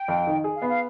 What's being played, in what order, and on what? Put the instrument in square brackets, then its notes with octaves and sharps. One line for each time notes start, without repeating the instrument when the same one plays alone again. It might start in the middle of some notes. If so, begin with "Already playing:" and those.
Already playing: [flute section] G5
[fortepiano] F2
D#3
G#4
[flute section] F5
[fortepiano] B3
[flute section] F5